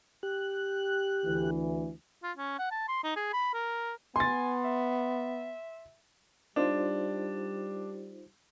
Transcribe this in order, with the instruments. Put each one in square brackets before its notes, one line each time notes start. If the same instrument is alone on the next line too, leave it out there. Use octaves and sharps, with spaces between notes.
[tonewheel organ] G4 F#6
[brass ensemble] D2 E3
[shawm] F4
C#4
F#5
A5
C6
D#4
G#4
B5
A#4
[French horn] B3 [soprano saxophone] G#5 [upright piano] C6 A6
[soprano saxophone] E5
[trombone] G3 [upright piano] D4 [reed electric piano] D#4 F4 C5